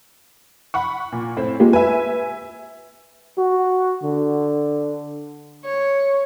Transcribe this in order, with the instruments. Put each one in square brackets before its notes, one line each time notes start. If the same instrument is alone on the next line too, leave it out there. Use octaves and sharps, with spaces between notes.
[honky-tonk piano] F#5 B5 C#6
A#2
A2 C4
[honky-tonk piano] G#3 [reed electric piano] A#3 F4 G4
[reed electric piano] B4 [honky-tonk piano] E5 G#5
[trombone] F#4
D3
[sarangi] C#5